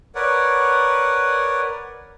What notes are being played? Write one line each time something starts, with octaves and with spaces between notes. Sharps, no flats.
A#4 B4 C#5 D5 F#5